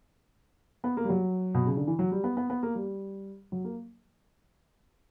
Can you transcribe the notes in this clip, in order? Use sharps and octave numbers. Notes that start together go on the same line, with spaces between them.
B3
A#3
G3
F#3
B2
C#3
D3
E3
F#3
G3
B3
B3
B3
A#3
G3
F#3
A#3